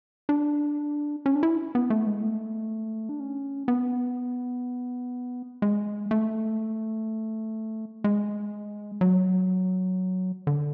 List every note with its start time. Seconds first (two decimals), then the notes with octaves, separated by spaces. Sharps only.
0.29 D4
1.26 C#4
1.35 D4
1.43 E4
1.75 B3
1.90 A3
2.06 G#3
2.23 A3
3.09 D4
3.20 C#4
3.68 B3
5.62 G#3
6.11 A3
8.04 G#3
9.01 F#3
10.47 D3